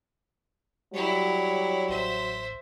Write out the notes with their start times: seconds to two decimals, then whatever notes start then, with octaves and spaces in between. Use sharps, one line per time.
0.93 F#3 G3 E4 C#5
1.89 A1 C5 E5